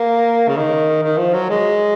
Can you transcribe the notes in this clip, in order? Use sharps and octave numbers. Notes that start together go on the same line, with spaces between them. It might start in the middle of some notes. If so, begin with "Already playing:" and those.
Already playing: A#3
C#3
D#3
D#3
F3
F#3
G#3